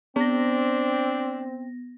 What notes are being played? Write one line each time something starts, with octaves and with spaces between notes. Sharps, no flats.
B3 C4 D4 A#6